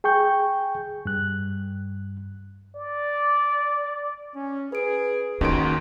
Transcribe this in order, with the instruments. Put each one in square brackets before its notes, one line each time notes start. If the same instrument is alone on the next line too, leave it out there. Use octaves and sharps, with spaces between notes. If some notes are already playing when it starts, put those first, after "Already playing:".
[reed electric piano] G#4 G5 C#6 G6
G2 F#6
[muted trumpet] D5
[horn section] C#4
[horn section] G#4 [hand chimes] B4 D7
[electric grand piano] D#2 D#3 D7 [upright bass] C#4 [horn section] F#4 [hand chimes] D#5 C6 G#6